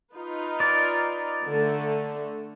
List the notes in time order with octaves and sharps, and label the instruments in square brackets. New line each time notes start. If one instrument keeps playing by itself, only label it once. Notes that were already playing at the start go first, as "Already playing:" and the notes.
[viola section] D#4 F4 B4
[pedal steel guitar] A#4 D5
[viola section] D3 A3